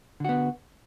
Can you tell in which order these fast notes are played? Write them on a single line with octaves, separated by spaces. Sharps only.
D3 F#4 B3